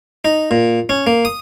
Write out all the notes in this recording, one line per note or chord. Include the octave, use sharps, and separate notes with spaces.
D#4
A#2
C#4
A#3
D#6